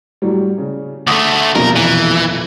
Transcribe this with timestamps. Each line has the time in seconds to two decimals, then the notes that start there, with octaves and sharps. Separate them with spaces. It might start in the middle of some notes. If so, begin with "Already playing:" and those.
0.22 A2 F#3 G3
0.58 C#3
1.07 D2 A3 D6 D#6
1.56 D#1 B1 F2 A#4
1.76 E3